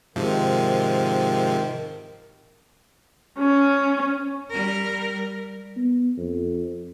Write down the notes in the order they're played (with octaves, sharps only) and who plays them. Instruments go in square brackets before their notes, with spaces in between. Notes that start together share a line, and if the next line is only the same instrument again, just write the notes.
[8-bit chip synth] G#2 C3 F3 [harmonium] D#3
[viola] C#4
[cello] G3 A#4
[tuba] B3
F2